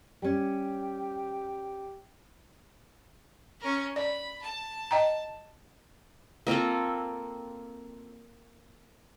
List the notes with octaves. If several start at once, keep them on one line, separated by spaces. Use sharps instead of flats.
G3 C#4 G4
C#4 A#4
D5 B5
A5
D#5 G5 A#5
A#3 C4 F4 A4